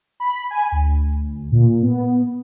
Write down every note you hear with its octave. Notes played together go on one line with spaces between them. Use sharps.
B5
G#5
D2
A#2
B3